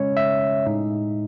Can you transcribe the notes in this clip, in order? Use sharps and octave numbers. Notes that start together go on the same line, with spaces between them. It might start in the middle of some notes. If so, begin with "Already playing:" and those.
Already playing: C#3 G#3 C#4 C#5
E5
A2 G#3 D#4